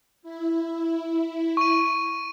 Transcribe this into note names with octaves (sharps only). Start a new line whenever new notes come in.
E4
C#6 D#7